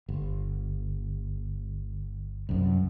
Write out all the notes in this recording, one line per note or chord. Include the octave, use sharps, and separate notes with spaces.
G1
C2 F#2